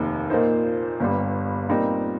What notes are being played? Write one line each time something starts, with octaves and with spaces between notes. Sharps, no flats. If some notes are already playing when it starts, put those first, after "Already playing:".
Already playing: F1 D#2 D#3 A#3
A#2 A#3 D#4 C5
G1 G2 G3
A#2 G3 C4 D#4 A#4